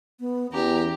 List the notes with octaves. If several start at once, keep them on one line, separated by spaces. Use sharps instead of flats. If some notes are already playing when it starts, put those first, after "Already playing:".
B3
E2 C#4 G4 A#5